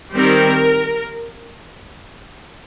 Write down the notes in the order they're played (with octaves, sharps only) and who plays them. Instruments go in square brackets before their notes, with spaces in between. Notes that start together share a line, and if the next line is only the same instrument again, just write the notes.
[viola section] D#3 G3 C4 A#4